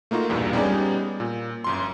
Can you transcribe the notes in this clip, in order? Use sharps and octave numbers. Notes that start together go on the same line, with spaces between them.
A3 A#3 D#4 F4 F#4
B1 E2 G2 A#2
G3 B3 C#4 D#4 G#4 D5
A#2
G1 F#2 C6